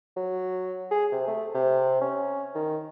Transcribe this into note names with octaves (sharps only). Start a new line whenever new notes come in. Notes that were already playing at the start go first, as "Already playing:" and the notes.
F#3
G#4
C3
A3
C3
C#4
D#3